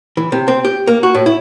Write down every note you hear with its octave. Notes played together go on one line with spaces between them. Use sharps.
E3
C3
C4
G4
A#3
F#4
A2
E4